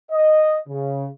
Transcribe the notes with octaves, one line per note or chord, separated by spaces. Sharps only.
D#5
C#3